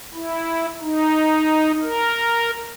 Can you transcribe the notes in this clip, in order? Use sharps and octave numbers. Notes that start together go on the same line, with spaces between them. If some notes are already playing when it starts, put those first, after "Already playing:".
E4
D#4
A#4